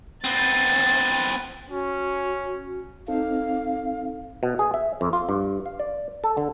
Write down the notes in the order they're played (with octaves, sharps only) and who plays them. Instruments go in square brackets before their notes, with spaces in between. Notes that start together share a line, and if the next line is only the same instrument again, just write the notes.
[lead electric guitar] B3 C4 [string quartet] A6
[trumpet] C#4 [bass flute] F#4
[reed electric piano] C4 D#4 A4 [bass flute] F5
[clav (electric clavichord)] B2
G#4
E5
F2
F4
G2
F5
D5
A4
D3